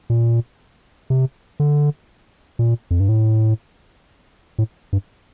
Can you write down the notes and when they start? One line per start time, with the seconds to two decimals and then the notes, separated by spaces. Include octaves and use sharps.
0.10 A#2
1.10 C3
1.60 D3
2.59 A#2
2.91 F2
3.00 G2
3.09 A2
4.59 A2
4.93 G2